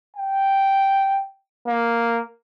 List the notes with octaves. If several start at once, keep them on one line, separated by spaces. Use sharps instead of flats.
G5
A#3